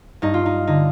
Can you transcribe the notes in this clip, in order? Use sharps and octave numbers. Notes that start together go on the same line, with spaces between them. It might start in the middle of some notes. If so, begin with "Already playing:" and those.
G2 D#4
F4
D#4
D3 D#4